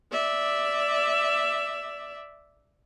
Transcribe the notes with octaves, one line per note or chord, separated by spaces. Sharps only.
D5 E5